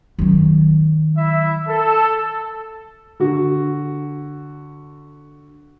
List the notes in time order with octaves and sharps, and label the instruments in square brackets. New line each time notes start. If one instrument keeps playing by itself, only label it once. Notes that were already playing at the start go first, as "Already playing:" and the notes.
[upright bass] D#3 F#3
[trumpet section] E4 E5
A4
[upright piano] D3 F#4